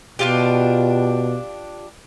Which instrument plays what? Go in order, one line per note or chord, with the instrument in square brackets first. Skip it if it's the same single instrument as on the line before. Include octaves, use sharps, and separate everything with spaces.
[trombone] B2 [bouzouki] D4 F4 G4